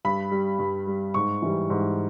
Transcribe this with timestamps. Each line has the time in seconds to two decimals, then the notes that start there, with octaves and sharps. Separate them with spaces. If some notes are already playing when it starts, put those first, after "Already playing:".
0.05 G2 B5
0.31 G3
0.59 G2
0.87 G3
1.14 G#2 C#6
1.42 E3 G3
1.70 G#2